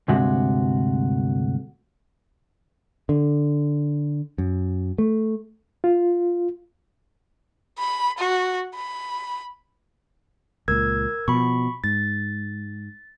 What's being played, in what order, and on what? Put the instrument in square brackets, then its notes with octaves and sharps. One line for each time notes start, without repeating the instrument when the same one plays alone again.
[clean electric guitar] D2 G2 C3 G#3 F#4
[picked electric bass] D3
F#2
A3
[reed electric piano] F4
[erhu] B5
F#4
B5
[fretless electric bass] C#2 A#2 [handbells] A#4 E6 G#6
[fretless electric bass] B2 F3 [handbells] B5 C#6
[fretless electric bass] G#2 [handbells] A6